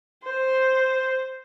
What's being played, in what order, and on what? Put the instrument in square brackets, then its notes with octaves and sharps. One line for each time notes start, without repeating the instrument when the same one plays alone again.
[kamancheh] C5